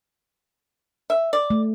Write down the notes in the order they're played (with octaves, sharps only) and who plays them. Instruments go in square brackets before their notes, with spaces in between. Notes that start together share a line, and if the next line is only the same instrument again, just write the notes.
[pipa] E5
D5
[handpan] A3